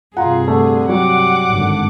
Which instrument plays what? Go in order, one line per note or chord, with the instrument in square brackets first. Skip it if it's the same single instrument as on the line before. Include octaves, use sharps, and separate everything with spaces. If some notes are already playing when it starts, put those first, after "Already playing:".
[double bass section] G2 C3 [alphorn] F4 [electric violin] G#4 [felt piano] F#5 A#5
[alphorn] D3 [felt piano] A3
[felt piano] F#3 [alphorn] G3 [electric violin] F#5 D6
[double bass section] G#1 G2 D3